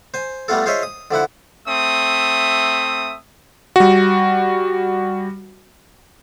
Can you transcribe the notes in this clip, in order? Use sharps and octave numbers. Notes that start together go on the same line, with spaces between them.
C5 G#5
G3 A3 B3 F4 A4
F4 G#4 C5 C#5 D#5 E5
D#6
D3 F3 E4 F#5
A3 C4 E5 D#6
G3 F#4